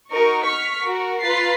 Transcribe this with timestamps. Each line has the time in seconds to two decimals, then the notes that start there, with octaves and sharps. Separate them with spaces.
0.10 D#4 F#4 A#4 D#5 C#6
0.45 C#6 F6 B6
0.82 F#4 A#4
1.22 F4 B4 A#5 A6 B6 C7